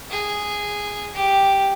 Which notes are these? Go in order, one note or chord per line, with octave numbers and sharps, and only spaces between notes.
G#4
G4